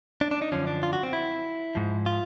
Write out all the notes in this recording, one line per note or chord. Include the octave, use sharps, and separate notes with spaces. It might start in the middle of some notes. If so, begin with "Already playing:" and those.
D4
D4
D#4
F#2 D3 F3 C#4
D4
F4
F#4
C4
E4
G#2 F3
F4